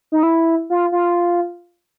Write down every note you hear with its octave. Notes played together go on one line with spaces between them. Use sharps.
D#4
E4
F4
F4